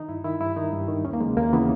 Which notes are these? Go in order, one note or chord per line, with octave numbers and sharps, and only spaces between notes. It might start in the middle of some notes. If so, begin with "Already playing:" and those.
Already playing: D#3 D#4
G2 E4
D#3 E4
G2 E4
D#3 D#4
G2
D#3
D#2 C#4
A#3
C#3 E3 G#3
D#2 A#3
C#3 E3 B3